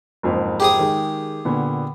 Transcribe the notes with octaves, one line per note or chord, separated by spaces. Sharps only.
F#1 F2 G#2
G4 G#4 D#6
D#3 G#3
A#2 D3 B3